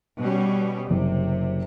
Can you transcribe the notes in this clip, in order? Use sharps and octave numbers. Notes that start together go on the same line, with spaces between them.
B2 G3 C#4
F#1 C3